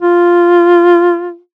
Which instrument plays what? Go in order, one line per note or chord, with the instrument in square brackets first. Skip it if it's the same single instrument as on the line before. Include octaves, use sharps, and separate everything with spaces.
[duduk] F4